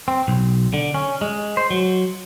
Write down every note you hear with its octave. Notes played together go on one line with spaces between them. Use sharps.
C4
B1
D3
C#4
G#3
C5
F#3